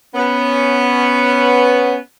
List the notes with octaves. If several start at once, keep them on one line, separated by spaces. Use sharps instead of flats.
B3 C#4